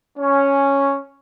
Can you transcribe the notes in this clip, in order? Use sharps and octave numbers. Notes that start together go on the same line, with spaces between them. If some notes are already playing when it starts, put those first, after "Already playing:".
C#4